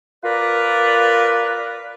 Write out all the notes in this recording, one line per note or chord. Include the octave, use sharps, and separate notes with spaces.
F4 A#4 B4 D5